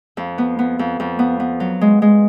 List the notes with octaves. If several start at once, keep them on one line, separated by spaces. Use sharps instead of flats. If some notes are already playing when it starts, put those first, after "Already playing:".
F2
B3
B3
F2
F2
B3
B3
F#3
G#3
G#3